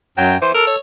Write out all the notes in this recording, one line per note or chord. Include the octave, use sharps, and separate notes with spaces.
F#2 F#3 G5
E3 C5
A4 A#4
C#5